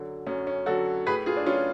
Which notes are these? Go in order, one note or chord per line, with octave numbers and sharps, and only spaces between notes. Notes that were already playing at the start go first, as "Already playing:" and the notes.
Already playing: F#2 D3 F#3
F#2 C#4
C#4
D3 F#3 F#4 A4
A2 G#4 B4
F4 G#4
D4
F#3 C#4 F4